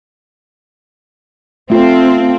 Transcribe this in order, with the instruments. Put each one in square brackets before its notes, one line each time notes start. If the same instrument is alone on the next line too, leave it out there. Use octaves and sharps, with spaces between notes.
[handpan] A3 F4 [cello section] C4